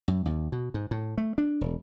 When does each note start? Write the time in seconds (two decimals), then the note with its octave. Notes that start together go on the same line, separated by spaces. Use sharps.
0.08 F#2
0.25 D#2
0.52 B2
0.74 G#2
0.91 A2
1.18 A3
1.38 D4
1.61 E1